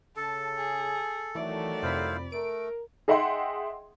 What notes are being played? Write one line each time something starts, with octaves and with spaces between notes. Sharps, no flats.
C#3 A4 A5
G#4
D#3 E3 F#3 A3 E4 D5
F2 C3 E4 C5 F5 B5
A3 A#4 D7
G#4 D#5 E5 F#5 G5 C6